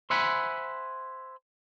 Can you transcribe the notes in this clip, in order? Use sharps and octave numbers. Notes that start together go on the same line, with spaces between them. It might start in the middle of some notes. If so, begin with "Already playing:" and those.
C5 E5 F#5 G#5 B5